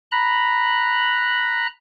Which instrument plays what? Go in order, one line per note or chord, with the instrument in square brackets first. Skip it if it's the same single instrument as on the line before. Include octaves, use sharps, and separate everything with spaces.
[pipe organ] A#5 B5 F#6